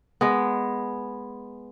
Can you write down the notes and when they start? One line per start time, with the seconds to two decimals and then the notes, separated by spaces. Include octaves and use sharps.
0.21 G#3 B3